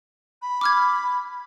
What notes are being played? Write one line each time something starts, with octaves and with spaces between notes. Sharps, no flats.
B5
D6 F6 G#6